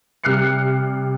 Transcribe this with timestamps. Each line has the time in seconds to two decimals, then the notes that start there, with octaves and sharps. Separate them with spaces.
0.24 C3 G3 F6 F#6 C7 C#7